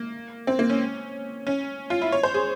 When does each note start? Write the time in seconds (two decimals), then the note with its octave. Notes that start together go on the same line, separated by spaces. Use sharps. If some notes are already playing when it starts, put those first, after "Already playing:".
Already playing: A#3
0.47 C4
0.59 A#3
0.70 C#4
1.47 C#4
1.90 F4
2.02 E4
2.12 C#5
2.23 C5
2.34 G#4